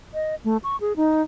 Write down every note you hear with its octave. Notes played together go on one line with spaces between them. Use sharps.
D#5
A3
C#6
G#4
D#4